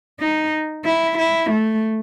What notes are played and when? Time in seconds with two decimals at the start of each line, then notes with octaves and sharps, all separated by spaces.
0.20 D#4
0.85 E4
1.18 E4
1.51 A3